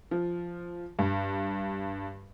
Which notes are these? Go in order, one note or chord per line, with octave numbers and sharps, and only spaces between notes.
F3
G2